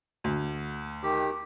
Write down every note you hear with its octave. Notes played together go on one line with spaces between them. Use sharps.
D2
D#3 G4